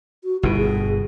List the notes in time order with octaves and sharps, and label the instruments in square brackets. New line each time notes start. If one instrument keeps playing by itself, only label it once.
[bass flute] F#4
[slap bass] G1 B2 [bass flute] E4
[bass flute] G#4